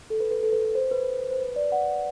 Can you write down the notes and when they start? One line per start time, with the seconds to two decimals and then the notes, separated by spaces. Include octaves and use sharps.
0.10 A4
0.20 B4
0.31 B4
0.43 A4
0.53 B4
0.65 B4
0.75 C5
0.91 B4
1.30 C5
1.39 B4
1.56 D5
1.72 F#5